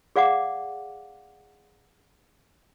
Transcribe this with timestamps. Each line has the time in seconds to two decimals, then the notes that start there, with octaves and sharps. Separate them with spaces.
0.16 G#4 D5 F5 F#5 D6